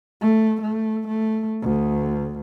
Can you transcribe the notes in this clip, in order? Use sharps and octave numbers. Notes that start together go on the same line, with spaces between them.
A3
A3
A3
D2